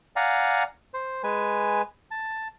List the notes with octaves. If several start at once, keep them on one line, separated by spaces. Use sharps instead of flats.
D5 F5 F#5 G#5 A#5
C5
G#3 B4 G#5
A5